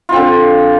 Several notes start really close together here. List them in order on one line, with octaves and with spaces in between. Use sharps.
F4 C4 D3